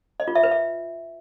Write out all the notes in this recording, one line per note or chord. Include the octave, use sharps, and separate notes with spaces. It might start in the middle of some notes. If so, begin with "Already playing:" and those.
D#5
F4
E5
B4
E5